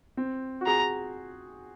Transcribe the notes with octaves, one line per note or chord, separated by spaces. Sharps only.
C4
F#4
G#4 A#5